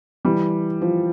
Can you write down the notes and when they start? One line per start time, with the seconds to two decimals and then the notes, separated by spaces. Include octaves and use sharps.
0.25 E3 G3
0.82 F3